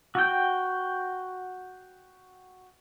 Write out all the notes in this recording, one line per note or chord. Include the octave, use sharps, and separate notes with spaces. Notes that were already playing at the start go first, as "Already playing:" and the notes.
F#4 G5